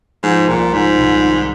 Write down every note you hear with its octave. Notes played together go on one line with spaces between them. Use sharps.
G#2 F3
C2 A#2
G#2 F3
C2
D#3